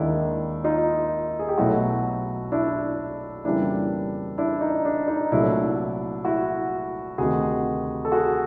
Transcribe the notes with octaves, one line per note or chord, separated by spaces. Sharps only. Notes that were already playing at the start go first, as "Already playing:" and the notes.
Already playing: D#2 D#3 G#3 D4 E4
D#4 F4
G#4
G4
B1 B2 F#3 A3 E4 F#4
D4 E4
F2 C#3 E3 G3 A#3 D4 E4
D4 E4
D#4
D4
D#4
C2 A#2 F#3 A3 D4 E4
E4 F#4
D2 C3 D#3 F#4 G#4
A4
F#4 G#4